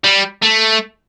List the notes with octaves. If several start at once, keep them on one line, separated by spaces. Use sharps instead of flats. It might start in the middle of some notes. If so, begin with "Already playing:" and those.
G3
A3